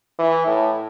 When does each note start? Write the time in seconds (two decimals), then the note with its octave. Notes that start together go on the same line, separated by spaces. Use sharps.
0.19 E3
0.47 A2